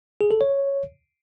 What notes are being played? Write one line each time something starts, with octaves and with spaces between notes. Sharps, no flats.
G#4
A4
C#5